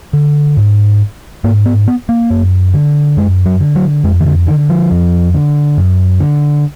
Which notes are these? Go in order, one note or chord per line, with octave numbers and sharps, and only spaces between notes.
D3
G#2
G#2 A#3
B3
B3
A#3
F#2
D3
F#2 G#3
F#3
D3
F#3
F2 G#3
D#3
D3
D3 D#3
F3
F2
D3
F#2
D3